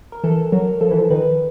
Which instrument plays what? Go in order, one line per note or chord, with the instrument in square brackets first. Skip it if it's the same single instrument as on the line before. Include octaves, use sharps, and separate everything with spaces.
[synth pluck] A#4
[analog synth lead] E3 [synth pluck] A4
[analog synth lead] F#3 [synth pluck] A#4
[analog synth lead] F3 [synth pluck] A4
[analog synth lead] E3
F3
[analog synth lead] D#3 [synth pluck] B4